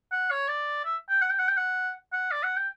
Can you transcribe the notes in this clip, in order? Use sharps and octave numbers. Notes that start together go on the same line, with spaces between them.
F#5
C#5
D5
E5
G5
F#5
G5
F#5
G5
F#5
F#5
D5
F#5
G5